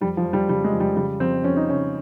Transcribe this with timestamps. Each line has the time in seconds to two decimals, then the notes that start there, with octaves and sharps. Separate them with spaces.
0.01 F2 G3
0.17 F3
0.25 F2
0.33 G3
0.49 C#3 G3
0.64 G#3
0.73 F2
0.80 G3
0.96 C#3 G3
1.20 F2 C4
1.44 F2 C#4
1.56 D#4
1.68 C#3 C#4